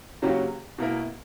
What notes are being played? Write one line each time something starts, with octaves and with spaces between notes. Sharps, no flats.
C#3 F#3 A#3 C#4 G4
B2 A#3 E4 A#4